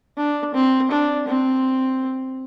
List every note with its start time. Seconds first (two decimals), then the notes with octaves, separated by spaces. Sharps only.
0.17 D4
0.54 C4
0.91 D4
1.28 C4